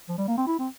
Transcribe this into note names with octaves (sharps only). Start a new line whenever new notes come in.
F3
G3
A#3
C4
E4
C4